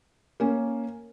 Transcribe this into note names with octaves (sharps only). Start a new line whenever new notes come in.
A#3 C#4